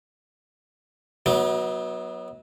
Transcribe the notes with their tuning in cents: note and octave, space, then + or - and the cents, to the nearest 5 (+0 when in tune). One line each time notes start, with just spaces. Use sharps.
F#3 +0 B3 -20 D#4 +40